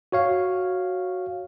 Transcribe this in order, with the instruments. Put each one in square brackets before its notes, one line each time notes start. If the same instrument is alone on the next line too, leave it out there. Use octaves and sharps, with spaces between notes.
[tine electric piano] F#4 C#5 F5